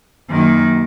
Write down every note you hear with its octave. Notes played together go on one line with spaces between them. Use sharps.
F#2 D#3 A#3